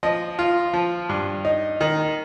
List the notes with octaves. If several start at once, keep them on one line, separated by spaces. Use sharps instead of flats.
F3 D#5
F4
F3
G2
D#4
D#3